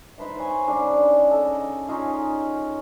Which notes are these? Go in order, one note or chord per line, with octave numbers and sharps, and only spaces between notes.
D#4 B4 C5 E5
C5 C#5 G#5
C#3 G3 D4 D#4
A4 D#5
C#4 D#4 F4 G#4